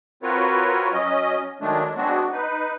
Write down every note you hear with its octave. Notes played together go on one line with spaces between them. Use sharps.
C4 F4 F#4 A#4 B4 C#5
F#3 C#4 D#5
D#3 F#3 G#3 A3 D4
F#3 G#3 B3 C4 D4 F#4
D#4 B4